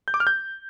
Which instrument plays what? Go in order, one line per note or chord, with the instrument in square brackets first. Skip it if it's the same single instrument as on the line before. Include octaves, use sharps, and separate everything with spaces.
[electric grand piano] G6
D6
F6
G6